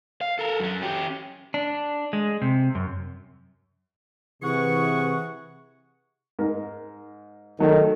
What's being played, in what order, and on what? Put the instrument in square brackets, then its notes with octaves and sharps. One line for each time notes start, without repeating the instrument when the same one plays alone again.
[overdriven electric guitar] F5
A4 A#4
F#2 F#3
C#4 G4
[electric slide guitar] D4
G#3
C3
F#2
[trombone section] C3 E3 [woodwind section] G#4 F#5 C#6
[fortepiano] G#2 A#4
[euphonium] D#3 [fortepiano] F#3 A3